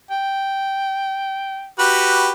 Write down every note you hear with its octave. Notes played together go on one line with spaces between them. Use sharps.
G5
F#4 G4 B4